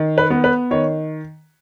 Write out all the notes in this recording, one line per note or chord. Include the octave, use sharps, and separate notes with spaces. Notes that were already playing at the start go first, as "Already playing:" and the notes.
Already playing: D#3
B4
B3
B4
D#3 C#5